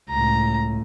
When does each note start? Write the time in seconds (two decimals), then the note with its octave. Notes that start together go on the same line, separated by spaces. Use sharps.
0.10 C#2 A2 A#5